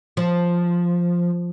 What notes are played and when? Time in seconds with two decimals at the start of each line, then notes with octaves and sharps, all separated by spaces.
0.17 F3